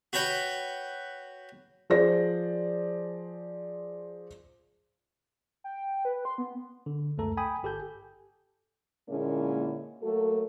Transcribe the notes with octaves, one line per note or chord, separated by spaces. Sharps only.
F#4 B4 C#5 G5
F3 G#4 C5 D5 A#6
G5
B4
C6
B3
D3
C#2 F#2 A3 A4 A#5
G5 G#5 B5 D#6
G1 G4 A4 G#5 G6
A#2 D3 G#3 A#3 C#4 E4
F#3 A3 A#3 F#4 A4